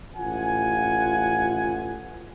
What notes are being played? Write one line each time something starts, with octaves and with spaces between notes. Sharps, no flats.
A1 F4 F#5 G#5